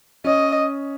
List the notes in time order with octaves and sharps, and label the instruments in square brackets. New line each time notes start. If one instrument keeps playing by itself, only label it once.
[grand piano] C#4 [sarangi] D#5